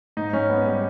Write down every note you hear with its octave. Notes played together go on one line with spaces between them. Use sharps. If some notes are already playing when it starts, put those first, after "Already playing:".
G#2 D#4
G#2 C#4
B3
G3